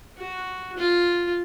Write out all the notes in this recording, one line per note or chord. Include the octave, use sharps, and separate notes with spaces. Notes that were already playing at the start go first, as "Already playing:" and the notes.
F#4
F4